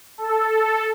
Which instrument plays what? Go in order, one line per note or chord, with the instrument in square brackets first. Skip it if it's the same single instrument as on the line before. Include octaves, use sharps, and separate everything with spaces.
[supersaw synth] A4